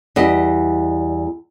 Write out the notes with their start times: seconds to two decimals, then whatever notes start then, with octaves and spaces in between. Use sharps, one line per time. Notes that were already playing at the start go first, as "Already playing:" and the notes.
0.16 E2 G3 D#5